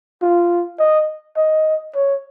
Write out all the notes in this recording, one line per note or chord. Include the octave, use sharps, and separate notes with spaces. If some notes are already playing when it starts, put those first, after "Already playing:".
F4
D#5
D#5
C#5